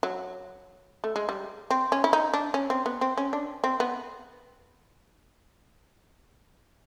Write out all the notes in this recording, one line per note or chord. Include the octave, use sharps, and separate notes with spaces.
F#3
A3
G#3
G3
C4
C#4
E4
D#4
D4
C#4
C4
B3
C4
C#4
D4
C4
B3